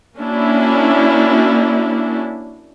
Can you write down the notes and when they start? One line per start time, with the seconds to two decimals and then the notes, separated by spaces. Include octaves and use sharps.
0.18 A#3 C#4 D4 E4 F#4